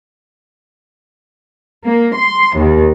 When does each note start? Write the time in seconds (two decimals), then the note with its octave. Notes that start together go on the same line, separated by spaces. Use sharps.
1.85 A#3
2.15 C6
2.56 D#2